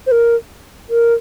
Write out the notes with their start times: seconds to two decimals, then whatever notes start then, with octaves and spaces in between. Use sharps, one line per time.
0.07 C5
0.11 A#4
0.90 A#4